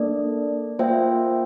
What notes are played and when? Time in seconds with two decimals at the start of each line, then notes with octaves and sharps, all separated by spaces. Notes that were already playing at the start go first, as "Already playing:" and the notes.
Already playing: A#3 D4 A4 D5
0.79 A#3 F4 C5 E5 G5